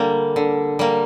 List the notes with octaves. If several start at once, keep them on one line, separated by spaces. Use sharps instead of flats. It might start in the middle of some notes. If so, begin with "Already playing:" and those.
Already playing: D3 G3 A#3
D3
G3 A#3